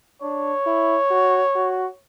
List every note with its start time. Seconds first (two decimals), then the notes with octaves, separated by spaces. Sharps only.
0.22 D4 C#5
0.66 E4
1.10 F#4
1.55 F#4